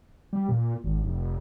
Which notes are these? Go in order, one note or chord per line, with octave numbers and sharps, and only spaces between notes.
G3
A#2
G#1
F1